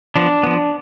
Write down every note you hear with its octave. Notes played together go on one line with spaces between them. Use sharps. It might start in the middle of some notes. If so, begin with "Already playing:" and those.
F3 B3 D4
F3 B3